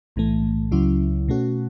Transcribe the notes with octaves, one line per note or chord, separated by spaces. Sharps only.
B1 A2 E3 A3
C#2 C#3 F#3 C#4 E4
B2 A3 C#4 F#4